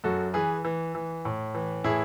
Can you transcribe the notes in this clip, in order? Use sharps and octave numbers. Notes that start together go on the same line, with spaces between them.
F#2 F#4 A4
E3 G#4 B4
E3
E3
A2
E3
A2 E4 G#4